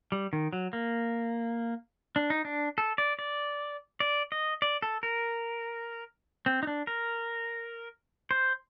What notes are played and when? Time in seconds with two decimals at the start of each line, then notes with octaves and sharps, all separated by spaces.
0.12 G3
0.33 D#3
0.53 F#3
0.73 A#3
2.16 D4
2.30 D#4
2.45 D4
2.78 A4
2.98 D5
3.19 D5
4.00 D5
4.32 D#5
4.62 D5
4.82 A4
5.03 A#4
6.46 C4
6.63 D#4
6.67 D4
6.87 A#4
8.31 C5